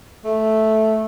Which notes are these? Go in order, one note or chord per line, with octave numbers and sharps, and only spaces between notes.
A3